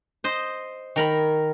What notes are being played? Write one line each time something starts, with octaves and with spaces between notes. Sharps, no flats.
C5 D#5
D#3 A#4 B5